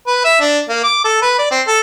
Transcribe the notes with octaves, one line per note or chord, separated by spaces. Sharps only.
B4
E5
D4
A#3
D6
A4
B4
D5
C4
A4